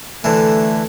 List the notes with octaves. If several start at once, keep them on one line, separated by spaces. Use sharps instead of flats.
D3 E3 A3